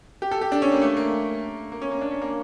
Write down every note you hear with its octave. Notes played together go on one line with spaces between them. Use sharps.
G4
A4
G4
D4
C#4
A#3
A3
A#3
A#3
C#4
A#3
D4
C#4
A#3